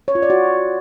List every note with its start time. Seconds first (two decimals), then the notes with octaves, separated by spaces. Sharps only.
0.08 C#5
0.15 F4
0.22 D5
0.30 F#4